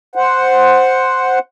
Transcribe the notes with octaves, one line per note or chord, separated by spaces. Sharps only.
C5 F#5